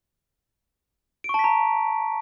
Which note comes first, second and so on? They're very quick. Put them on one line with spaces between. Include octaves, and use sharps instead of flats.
D7 C#6 A5 B6 A#5